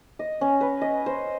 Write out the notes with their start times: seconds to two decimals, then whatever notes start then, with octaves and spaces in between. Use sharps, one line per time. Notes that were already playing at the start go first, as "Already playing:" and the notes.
0.19 D#5
0.41 C#4
0.61 B4
0.81 D#5
1.06 C5